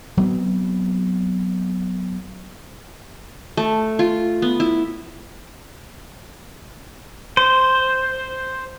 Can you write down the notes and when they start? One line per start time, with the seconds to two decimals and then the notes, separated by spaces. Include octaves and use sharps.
0.17 F#3 B3 C4
3.57 A3
3.99 F4
4.42 B3
4.60 E4
7.37 C5